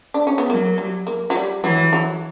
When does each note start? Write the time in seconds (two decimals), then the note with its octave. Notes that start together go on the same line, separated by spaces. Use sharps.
0.14 D4
0.27 C#4
0.38 B3
0.50 F#3 A#3
0.78 G3
1.07 A#3
1.30 F#3
1.35 G3
1.64 E3 F#3
1.93 F#3